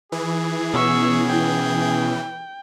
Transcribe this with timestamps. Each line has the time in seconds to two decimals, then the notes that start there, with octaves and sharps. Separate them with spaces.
0.12 E3 G#4
0.74 B2 B3 C#4 C#6 E6
1.28 G5